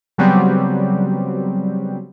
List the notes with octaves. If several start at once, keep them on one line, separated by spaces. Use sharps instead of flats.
C#3 F#3 G3 B3 C4